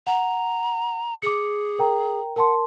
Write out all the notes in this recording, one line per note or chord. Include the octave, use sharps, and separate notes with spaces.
F#5 A#5
G#4 D6 C#7
A#4 G5 A#5
A#4 F#5 A5 C6